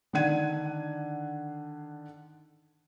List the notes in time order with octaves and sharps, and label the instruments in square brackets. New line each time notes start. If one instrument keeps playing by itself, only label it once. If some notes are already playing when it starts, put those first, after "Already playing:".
[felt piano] D3 D#3 D4 F#5 G#6 D#7